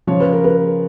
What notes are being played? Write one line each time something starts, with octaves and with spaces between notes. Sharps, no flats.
C#3 F3 C#5
B4
A#4
G#4 B4